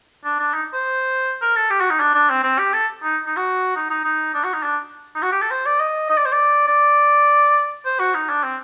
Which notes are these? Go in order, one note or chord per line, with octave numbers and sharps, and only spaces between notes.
D4
D4
D#4
C5
A#4
A4
G4
F#4
D#4
D4
D4
C4
C4
G4
A4
D#4
D#4
F#4
D#4
D#4
D#4
D4
F#4
D#4
D4
D#4
F#4
G4
A4
C5
D5
D#5
D#5
D5
C5
D5
D5
C5
F#4
D#4
D4
C4